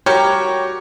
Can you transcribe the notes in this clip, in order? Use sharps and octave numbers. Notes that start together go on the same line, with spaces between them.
G3 F#4 G4 A#4 C#5